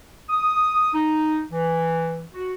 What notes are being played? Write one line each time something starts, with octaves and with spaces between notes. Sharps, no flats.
D#6
D#4
E3
F#4